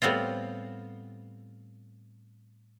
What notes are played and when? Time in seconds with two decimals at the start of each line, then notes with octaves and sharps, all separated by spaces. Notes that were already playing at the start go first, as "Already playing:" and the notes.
0.02 A2 G3 B3 C4 F4